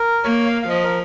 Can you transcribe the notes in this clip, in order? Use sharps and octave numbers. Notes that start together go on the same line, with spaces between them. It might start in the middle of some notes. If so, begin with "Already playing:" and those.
Already playing: A#4
A#3 C#5
F5
F5
F3 D#5
A#4